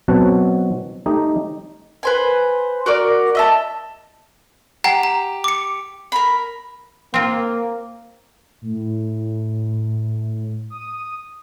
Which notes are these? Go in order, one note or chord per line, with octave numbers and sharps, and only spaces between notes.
B2 F#3 C4 F#4 F#5 A5
A3 D#4 G4 D#5
B4 C5 G#5
F#4 A#4 D5
D#5 E5 A5
G4 F#5 G5 A#5
A#5
D6 C#7
A#4 B5
A#3 C4 F4
A2
D#6